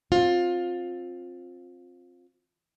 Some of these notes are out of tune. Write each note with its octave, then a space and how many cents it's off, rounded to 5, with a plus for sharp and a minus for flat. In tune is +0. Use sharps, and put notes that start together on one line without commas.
C4 +15 F4 +20